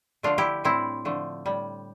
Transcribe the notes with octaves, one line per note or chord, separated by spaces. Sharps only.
D3 F3 A3 D4 F4
E4 G4
A2 G3 C4 E4
D3 F3 A3
A2 G3